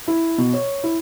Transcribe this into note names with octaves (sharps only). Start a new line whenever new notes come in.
E4
B2
C#5
E4